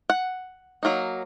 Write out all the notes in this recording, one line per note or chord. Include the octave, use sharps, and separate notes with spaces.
F#5
F#3 A#3 D#4